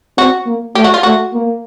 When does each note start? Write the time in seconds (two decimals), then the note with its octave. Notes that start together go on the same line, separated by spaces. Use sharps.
0.18 C4 F#4
0.46 A#3
0.75 A3 G4
0.84 F#4
0.94 F4
1.03 A3 F#4
1.33 A#3